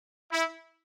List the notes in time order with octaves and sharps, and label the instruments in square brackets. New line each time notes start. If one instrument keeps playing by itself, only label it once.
[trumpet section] E4